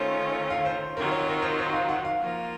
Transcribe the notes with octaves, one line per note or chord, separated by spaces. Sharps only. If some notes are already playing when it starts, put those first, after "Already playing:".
Already playing: D#3 A3 C#4 F4 C5
F5
C5
D#3 F#3 C4 F4 A#4
C#5
A#4
C5
C5
F5
F#5
F5
F3 A#3 F4